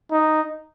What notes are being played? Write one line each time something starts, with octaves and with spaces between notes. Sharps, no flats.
D#4